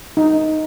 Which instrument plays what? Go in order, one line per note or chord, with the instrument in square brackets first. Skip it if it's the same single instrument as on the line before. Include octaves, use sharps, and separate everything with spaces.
[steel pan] D#4